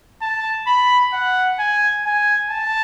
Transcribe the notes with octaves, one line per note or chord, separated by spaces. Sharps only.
A5
B5
F#5
G#5
G#5
A5